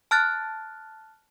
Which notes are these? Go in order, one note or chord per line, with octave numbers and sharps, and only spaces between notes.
A5 F6 F#6 A6